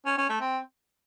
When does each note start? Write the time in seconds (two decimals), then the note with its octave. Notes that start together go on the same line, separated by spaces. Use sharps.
0.06 C#4
0.18 C#4
0.29 A3
0.41 C4